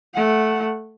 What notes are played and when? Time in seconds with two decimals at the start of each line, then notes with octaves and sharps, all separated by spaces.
0.14 A3 F#5